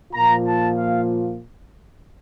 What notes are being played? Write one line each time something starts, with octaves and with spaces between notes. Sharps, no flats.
A#2 F3 A#3 F4 A#5
A5
F5